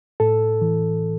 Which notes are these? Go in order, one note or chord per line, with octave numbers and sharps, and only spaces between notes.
A2 A4
E3